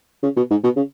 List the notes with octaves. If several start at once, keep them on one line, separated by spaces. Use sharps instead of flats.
C#3
B2
G#2
B2
C#3